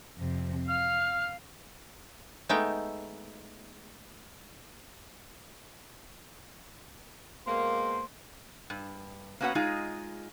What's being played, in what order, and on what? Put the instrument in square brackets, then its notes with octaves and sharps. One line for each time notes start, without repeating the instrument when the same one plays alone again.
[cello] F2 C3
[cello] F5 [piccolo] F6
[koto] G#3 A3 B3 D#4 E5 G5
[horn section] B2 G#3 A#3 [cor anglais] C5
[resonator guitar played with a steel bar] G2
A#3 B3 C#4 F#4 B4 F#5
G#3 D#4 F4 G#4